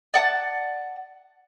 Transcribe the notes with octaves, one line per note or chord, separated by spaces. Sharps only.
D5 F#5 A5